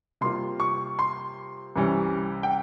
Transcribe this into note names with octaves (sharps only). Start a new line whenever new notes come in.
C3 G3 A#3 F4 C6
C#6
C6
C2 C3 E3 G3 C#4
G5